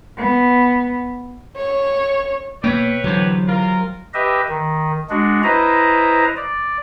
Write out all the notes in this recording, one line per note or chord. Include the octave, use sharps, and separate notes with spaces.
B3
C#5
B2 A#3 B4 C#5 E5 G5
D3 E3 F#3 G4 C5
F4 A#4
G4 B4 D#5 E5
D#3
G#3 D4 F#4
E4 B4 C5 D#5 A#5
D5